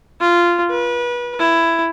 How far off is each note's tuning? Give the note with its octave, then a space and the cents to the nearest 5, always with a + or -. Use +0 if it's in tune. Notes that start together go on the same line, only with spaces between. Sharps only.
F4 -10
B4 -30
E4 +10